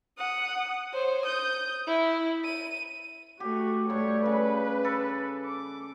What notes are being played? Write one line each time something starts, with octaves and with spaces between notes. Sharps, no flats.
F#5 D#6
C5 C#5
D#6 G6
E4
D#7
A3 F#4 G4
G2 A3 C#5
C#3 B4
A4
D6